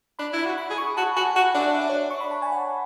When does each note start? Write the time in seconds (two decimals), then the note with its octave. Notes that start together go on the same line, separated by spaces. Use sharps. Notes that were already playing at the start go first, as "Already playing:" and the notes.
0.19 D4 B5
0.33 E4
0.38 B5
0.45 F#4
0.58 B5
0.70 G#4
0.78 C#6
0.97 F#4 A5
1.16 F#4 G#5
1.36 F#4 F#5
1.54 D4 E5
1.74 E5
1.82 D5
1.89 C#5
1.96 D5
2.10 C#6
2.21 B5
2.31 A5
2.42 G#5
2.52 F#5